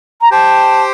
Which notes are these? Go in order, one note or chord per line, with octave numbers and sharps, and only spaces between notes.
A#5
G4 C5 G5 A5